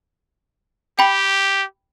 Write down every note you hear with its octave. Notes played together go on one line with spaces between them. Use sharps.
G4 G5 B5